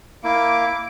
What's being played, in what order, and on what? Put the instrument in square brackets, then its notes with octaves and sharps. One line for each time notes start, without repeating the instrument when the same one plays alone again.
[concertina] A#3 E4 [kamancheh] D6